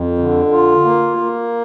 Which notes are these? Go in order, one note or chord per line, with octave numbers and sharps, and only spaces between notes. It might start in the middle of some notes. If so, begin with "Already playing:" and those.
Already playing: F2
D3
F4
A#3
A#3